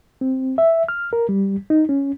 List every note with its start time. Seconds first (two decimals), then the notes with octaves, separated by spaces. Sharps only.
0.21 C4
0.58 E5
0.88 F6
1.13 A#4
1.29 G3
1.70 D#4
1.89 C#4